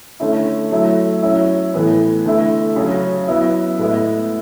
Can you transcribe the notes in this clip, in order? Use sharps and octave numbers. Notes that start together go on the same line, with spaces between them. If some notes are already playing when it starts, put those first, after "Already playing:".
D3 A3 C#4 E4
F#3 A3 E4
F#3 C#4 E4
A2 E3 B3
D3 A3 E4
C#3 F#3 C#4
F#3 B3 E4
A2 G#3 B3 E4